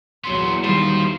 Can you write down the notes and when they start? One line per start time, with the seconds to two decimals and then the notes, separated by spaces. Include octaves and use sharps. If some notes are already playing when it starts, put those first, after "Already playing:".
0.24 E2 A#2 F#3 B3 C6
0.64 D#3 G3 F4 C5